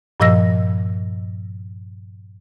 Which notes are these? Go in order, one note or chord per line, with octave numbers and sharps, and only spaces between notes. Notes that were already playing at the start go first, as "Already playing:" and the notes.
G2 A#2 F3 D#5 E6 A#6